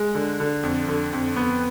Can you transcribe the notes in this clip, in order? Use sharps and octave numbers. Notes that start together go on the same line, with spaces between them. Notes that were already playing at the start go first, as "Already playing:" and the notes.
Already playing: G#3
D3
D3
F2
D3
F2
B3